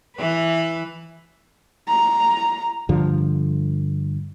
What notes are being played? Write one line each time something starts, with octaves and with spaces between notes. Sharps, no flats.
E3 B4
A#5
G2 D3 F3